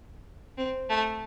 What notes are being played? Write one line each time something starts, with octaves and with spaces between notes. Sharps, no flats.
C4
A3